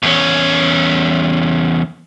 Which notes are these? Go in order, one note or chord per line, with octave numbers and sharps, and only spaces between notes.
E2 C#4